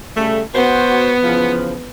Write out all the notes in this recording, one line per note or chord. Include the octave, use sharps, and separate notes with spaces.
C#3 G3 A3
B3 F#4 C5
C#3 E3 F3